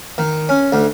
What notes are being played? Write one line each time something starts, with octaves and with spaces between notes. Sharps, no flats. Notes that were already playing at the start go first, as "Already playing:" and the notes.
D#3
C#4
D2